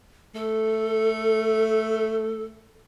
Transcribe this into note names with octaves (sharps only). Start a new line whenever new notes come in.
A3 A4